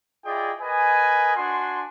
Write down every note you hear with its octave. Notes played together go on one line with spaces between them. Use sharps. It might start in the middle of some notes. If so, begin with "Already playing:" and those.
E4 F4 G#4 D5 D#5 G5
A#4 B4 D#5 G#5
D4 F#4 G#5 C6